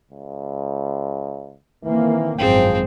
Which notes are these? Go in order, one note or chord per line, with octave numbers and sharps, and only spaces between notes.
C#2
D#3 E3 A#3 C4
G#1 F#2 A#2 F3 C4 G#4 C5 G5